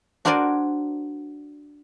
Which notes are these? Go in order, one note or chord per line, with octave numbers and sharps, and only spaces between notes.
D4 F#4 A#4 C5 D5 G#5